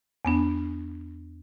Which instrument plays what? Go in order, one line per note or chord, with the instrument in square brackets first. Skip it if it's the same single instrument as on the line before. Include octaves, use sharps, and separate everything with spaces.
[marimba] E2 B3 D4